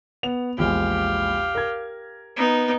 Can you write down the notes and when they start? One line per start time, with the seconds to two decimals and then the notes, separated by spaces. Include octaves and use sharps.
0.23 B3 F7
0.58 A#1 E2 G#3 G4 F5
1.55 A#4 G#6
2.37 B3 D#4